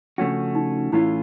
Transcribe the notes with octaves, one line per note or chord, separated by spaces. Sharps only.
C#3 F3 A3 C#4 D4 F#4
D#4
A2 E3 A3 C#4 E4 F4